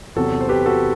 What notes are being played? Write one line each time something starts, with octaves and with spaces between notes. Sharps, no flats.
E2 C3 F#3 F#4 A4
C5
G4 B4
F#4 A4